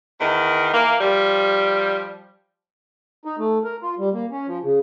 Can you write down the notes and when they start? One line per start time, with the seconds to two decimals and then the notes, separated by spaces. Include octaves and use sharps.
0.20 E2 D#3
0.73 E3 A#3
1.01 F3 G3
3.25 D#4
3.39 A3
3.64 A#4
3.82 F4
3.99 G3
4.14 A#3
4.31 C#4
4.48 F3
4.64 C#3